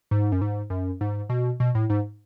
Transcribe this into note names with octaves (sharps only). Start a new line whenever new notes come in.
G#2
F#2
G#2
F#2
G#2
B2
B2
A2
G#2